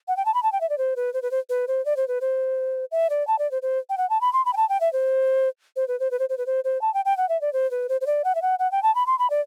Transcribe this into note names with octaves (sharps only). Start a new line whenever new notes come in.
F#5
G5
A5
B5
A5
G5
E5
D5
C5
B4
C5
B4
C5
B4
C5
D5
C5
B4
C5
E5
D5
A5
D5
C5
C5
G5
F#5
A5
B5
C6
B5
G5
A5
G5
E5
C5
C5
B4
C5
B4
C5
C5
B4
C5
C5
A5
G5
G5
F#5
E5
D5
C5
B4
C5
C5
D5
F#5
E5
F#5
F#5
G5
A5
B5
C6
B5
D5